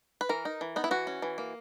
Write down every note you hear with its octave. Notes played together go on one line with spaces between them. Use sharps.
B4
E3 A#4
D#4
E3
B3 D#4
E4
E3 F#4
C#4
E3
A#3